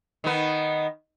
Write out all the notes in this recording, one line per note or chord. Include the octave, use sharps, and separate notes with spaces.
D#3 B3